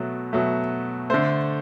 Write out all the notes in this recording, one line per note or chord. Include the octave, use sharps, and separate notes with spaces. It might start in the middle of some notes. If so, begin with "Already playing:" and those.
Already playing: B2 F#3 A3
B2 F#3 A3
D3 A3 C5